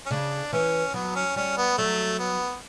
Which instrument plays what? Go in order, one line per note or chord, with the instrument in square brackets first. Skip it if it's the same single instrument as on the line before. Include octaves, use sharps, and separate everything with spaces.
[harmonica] C#4
[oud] C#3 [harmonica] D4
[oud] E3 [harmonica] C#4
[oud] F#3 [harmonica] B3
[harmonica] C#4
[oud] G3 [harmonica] C#4
[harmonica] B3
[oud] F#3 [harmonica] A3
[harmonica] B3